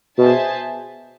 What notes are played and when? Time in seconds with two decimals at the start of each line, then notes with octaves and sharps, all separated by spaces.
0.18 B2 G#4 C5 E5 A5